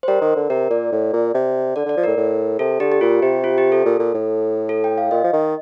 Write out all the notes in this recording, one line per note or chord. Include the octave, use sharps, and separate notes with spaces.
C5
G3 A#4
D#3
D3
C3 A#4
A#2 D5
A2
A#2
C3
D3 D5
D3 D5
F3
A2 A#4
A2
C3 A4
D3 G4
G4
A#2 F4
C3 G4
F4
G4
A4
A#2
A#2
A2
A4
G5
F5
A#2 D#5
F3
D#3